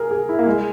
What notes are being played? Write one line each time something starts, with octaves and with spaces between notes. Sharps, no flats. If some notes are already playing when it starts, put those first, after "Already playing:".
Already playing: G#4 A#4
G#4
E4
A#3
G#3